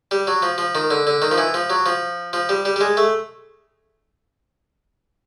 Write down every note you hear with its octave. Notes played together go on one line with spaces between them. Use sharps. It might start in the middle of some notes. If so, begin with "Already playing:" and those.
G3
F#3
F3
F3
D#3
D3
D3
D#3
F3
E3
F3
F#3
F3
F3
G3
G3
G3
G#3
A3